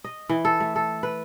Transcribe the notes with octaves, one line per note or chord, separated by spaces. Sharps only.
D#5
E3
A4
A3
A4
B4